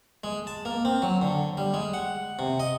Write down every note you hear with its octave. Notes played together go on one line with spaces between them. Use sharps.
G#3
A5
A#3
C4
F#3
D3
G3
G#3
F#5
C3
D#5